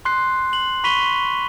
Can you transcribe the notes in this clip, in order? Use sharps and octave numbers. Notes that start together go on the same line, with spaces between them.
C6 F#6 C7
F#7
B5 C#6 B6 D#7 F7 G7